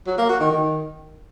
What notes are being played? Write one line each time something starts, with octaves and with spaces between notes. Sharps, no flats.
F#3
A#3
F#4
D#3
D#3